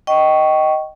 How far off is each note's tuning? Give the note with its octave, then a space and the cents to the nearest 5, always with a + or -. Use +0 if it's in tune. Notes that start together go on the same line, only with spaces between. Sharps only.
D#5 +0 G5 -25 C#6 +0